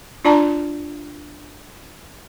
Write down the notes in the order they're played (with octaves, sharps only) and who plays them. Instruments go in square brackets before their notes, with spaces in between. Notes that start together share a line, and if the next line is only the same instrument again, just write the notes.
[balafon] D4 F4 D5 A5 A#5